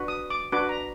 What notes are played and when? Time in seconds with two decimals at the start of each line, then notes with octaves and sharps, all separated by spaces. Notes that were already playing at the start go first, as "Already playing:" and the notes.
Already playing: D4 F#4 B4
0.08 D#6
0.30 D6
0.52 D4 F#4 B4 D6
0.69 A#5